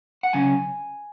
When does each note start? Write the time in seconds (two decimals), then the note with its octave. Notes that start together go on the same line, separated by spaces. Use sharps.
0.23 F#5
0.33 C#3 F#3 C#4 G#5